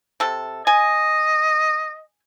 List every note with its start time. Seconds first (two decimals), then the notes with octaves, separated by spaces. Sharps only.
0.20 C3 A4
0.67 D#5 G#5